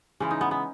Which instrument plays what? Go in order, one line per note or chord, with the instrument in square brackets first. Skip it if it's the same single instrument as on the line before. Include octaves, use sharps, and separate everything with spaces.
[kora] C#3 E3 G#3 C#4
D#4
B3
B3